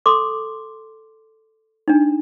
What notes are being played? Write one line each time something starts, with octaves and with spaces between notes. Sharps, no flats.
A4 C6 D6
D4 D#4